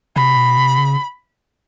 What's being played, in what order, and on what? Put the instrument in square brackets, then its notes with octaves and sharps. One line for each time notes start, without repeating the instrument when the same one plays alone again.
[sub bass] C3 [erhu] B5
[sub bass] B2
C3
C#3